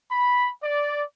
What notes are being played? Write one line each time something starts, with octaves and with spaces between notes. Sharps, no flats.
B5
D5